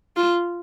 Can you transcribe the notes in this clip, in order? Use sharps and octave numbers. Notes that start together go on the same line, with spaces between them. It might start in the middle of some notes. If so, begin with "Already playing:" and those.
F4